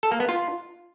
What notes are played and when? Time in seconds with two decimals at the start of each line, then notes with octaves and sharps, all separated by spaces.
0.03 A4
0.12 A#3
0.20 B3
0.29 F4